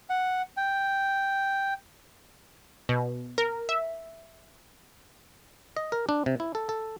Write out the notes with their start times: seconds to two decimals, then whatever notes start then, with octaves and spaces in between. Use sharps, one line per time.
0.10 F#5
0.57 G5
2.89 B2
3.38 A#4
3.69 E5
5.76 D#5
5.92 A#4
6.09 D4
6.26 C3
6.40 E4
6.55 A4
6.69 A4